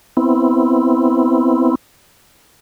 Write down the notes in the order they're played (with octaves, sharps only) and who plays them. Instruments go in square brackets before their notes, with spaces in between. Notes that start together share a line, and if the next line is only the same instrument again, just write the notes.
[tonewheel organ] B3 C4 E4